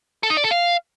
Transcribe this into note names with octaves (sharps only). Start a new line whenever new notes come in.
A4
D#4
D5
A4
F5